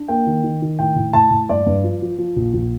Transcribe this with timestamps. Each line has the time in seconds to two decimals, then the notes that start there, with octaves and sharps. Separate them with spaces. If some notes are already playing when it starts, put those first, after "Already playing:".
Already playing: D4
0.08 A#3 G5
0.27 D#3
0.44 D#3
0.62 D#3
0.79 A2 G5
0.96 A2
1.13 A2 A5
1.31 A2
1.49 G2 D5
1.66 G2
1.84 F3
2.02 F3
2.18 F3
2.36 A#1
2.53 A#1